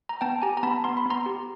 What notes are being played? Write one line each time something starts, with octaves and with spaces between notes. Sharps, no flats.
A#5
B3 G5 A5
G4 G#5 A#5
A#5
B3 A5 B5
B3 C6
B5
B3 A#5 C6
G4